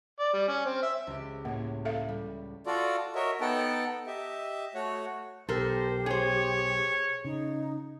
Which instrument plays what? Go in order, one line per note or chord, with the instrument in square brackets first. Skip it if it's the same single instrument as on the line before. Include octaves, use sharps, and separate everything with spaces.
[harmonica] D5
G3
C#4
C4
E5
[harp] C#2 G4
[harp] A2 C#5 [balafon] A#3
[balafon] A4 E5 F5
[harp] G3
[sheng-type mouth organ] F4 F#4 A4 D5
F#4 A#4 C#5 D#5 E5
B3 D#4 A4 F#5 G5 A5
G4 D#5 E5
A3 F#4 C#5 F#5
[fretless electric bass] B1 [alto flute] G4 [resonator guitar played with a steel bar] A4 A#4 [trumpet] C5
[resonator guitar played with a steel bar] G#4 C5 [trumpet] C#5
[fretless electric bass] C#3 [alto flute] D#4